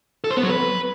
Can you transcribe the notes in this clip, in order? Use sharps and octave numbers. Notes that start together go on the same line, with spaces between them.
A4
C5
B3
F#3
B4